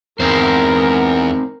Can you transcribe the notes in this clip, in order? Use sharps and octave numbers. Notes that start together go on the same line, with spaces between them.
E2 C4 D#4 A#4 C5